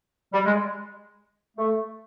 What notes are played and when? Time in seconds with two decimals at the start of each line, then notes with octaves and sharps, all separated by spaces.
0.33 G3
0.46 G#3
1.58 A3